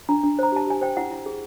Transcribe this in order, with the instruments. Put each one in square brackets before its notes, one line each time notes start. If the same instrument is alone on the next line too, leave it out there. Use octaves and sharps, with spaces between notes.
[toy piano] D4 A#5
D4
C5 A#5
G4 A5
G4 G#5
C5 G5
E4 F#5
E4
G#4